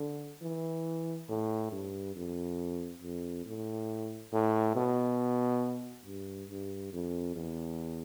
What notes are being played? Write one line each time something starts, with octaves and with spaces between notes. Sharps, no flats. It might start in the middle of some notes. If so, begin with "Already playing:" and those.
Already playing: D3
E3
A2
G2
F2
F2
A2
A2
B2
G2
G2
F2
E2